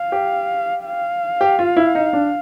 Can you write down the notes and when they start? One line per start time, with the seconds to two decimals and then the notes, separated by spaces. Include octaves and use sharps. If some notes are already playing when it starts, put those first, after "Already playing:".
Already playing: F5
0.12 G4
0.85 F5
1.41 G4
1.59 F4
1.76 E4
1.95 D#4
2.13 D4